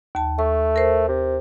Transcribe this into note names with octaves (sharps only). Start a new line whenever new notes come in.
D#2 A5
A3 C#6
A#4 C5
C3